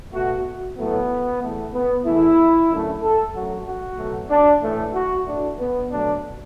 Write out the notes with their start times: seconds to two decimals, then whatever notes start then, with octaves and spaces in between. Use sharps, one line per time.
0.13 B2 A3 F#4
0.77 A2 F#3 A3 B3
1.41 E2 E3 A3
1.73 B3
2.06 E2 E3 A3 E4
2.70 F#2 D3 A3
3.02 A4
3.34 F#2 F#3 A3 F#4
3.66 F#4
3.97 B2 F#3 A3
4.30 D4
4.62 A2 E3 A3
4.94 F#4
5.26 A2 A3 D4
5.58 B3
5.90 B2 F#3 A3 D4